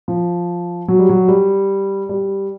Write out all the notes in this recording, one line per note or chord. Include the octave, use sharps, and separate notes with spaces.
F3
F#3
G3
F#3
G3
G3